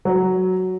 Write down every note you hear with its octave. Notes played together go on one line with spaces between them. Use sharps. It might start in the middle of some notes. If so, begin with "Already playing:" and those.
F#3